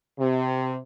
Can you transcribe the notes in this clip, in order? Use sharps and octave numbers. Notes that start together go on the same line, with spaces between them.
C3